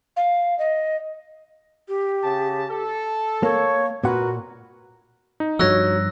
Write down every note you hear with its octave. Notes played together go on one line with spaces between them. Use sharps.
F5
D#5
G4
C#3 A5
A4
A#3 C#5
A#2 F#4 A#4 B4 F#5
D#4
G2 F3 F#4 C#5 E6 F#6 A#6